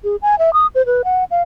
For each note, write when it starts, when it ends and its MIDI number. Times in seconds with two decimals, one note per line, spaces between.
0.04 0.16 68
0.22 0.38 80
0.39 0.53 76
0.53 0.67 87
0.75 0.85 72
0.86 1.02 71
1.04 1.24 78
1.31 1.42 77